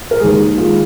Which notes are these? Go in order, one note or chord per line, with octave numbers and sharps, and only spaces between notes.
A#4
D#2 D#3 G#3 G#4
D#3 G#3 F4